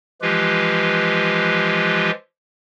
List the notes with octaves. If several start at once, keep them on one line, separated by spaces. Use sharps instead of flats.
E3 F3 G#3 F4 G4 B4